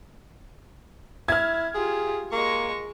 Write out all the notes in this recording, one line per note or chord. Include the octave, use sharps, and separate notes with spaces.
E4 F6 G#6
F4 G4 G#4
G#3 A#3 C#6